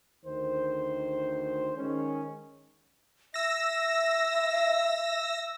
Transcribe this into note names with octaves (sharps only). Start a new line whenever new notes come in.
D2 D#3 C5
D#3 G#3 C#4
E5 E6 A#6